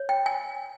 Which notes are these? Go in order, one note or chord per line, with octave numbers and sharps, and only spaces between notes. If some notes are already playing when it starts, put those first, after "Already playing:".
Already playing: C#5
G5
G#5